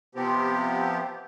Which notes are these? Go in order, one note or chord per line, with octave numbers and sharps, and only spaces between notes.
C3 F3 B3 C4 G4